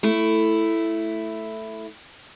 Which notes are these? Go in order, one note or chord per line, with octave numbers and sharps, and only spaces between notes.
A3 E4